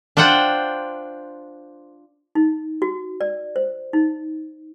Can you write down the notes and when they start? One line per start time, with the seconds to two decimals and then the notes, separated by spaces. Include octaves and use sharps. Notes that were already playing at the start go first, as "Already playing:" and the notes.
0.17 D4 F4 C5 F#5 G5
2.35 D#4
2.82 F#4
3.21 D5
3.56 C5
3.93 D#4